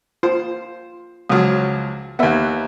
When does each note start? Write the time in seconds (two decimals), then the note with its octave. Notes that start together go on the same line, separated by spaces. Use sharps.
0.23 F4 C5
1.29 C#2 F3 F#3 D#6
2.19 D#2 B3 A#4 E5 F#5